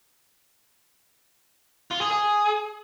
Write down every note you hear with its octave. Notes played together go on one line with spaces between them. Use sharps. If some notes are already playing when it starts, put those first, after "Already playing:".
F4
G#4
G#4